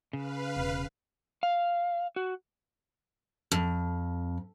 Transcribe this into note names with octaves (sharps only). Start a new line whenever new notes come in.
C#3 B4 F5
E1
F5
F#4
F2